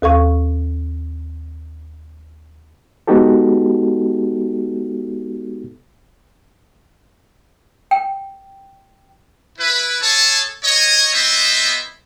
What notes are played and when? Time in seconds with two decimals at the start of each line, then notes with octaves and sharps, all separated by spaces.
0.02 D#2 A4 F5 C#6
3.07 G#3 B3 D#4 F#4 G4 A4
7.91 G5
9.58 E4 B4
10.02 G#4 A4 C#5 A5
10.64 C#5 D#5
11.13 B3 C4 E4 C5 D#5 E5